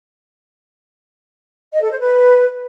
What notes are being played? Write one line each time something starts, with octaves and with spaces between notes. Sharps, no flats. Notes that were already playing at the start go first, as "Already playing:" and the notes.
D#5
A4
C5
B4